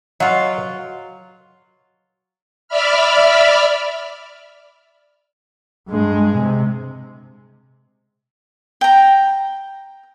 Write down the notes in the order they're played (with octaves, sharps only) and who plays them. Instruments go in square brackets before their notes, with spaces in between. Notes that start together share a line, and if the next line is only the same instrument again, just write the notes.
[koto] F#3 F4 [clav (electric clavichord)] C#5 D#5 F5
[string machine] D5 E5 B5 F6
[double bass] G2 G#3
C3
[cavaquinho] G5 A#5